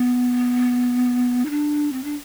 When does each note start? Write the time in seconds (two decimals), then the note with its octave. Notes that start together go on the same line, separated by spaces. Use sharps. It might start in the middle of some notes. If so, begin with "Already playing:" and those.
Already playing: B3
1.45 D#4
1.50 D4
1.93 C4
2.04 D4